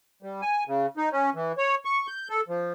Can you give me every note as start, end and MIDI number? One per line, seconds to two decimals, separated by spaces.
0.22 0.41 55
0.42 0.64 80
0.67 0.86 49
0.97 1.09 63
1.12 1.30 61
1.34 1.52 52
1.58 1.75 73
1.85 2.07 85
2.07 2.28 91
2.29 2.41 69
2.48 2.73 53